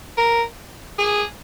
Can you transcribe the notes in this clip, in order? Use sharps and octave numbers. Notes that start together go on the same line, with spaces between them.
A#4
G#4